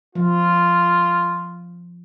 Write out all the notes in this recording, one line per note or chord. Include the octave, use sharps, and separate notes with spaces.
F3 F4